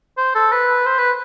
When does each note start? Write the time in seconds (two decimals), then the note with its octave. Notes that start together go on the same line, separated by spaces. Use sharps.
0.18 C5
0.35 A4
0.53 B4
0.86 C5
0.99 B4